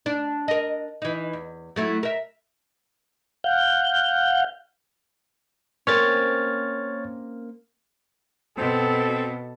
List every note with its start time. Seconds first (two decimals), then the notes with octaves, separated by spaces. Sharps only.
0.06 D4
0.48 A#4 D#5
1.02 E3 D#4
1.33 E2
1.76 F#3 A3 E4
2.03 A#4 E5
3.44 F5 F#5 G6
5.87 A#3 C4 C#4 C#5 F6 A6
8.57 B2 C4 A4